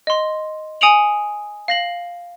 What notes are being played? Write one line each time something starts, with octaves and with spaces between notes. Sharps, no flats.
D#5 C6
G#5 D#6 C#7 D7 F7 F#7
F5 A#6 F#7